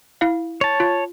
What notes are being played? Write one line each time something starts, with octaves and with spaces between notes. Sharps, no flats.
E4 F5
C#5 A5
F4